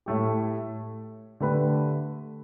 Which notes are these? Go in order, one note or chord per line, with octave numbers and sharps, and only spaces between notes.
A2 A3 G4
D3 A3 G4 B4